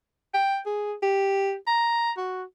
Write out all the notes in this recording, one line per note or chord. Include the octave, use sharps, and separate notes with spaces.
G5
G#4
G4
A#5
F#4